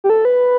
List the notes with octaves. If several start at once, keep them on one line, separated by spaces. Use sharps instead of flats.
G4
A4
B4